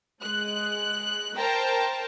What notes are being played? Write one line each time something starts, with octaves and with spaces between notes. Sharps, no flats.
G#3 F#6
A#4 C5 G5 A5 A#5